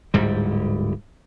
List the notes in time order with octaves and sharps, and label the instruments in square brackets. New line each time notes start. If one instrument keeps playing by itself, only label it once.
[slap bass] D1 G#2 G3